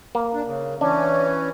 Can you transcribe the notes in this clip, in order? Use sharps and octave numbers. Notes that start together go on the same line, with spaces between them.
A#3
D4
C#3
E3 C#4 D4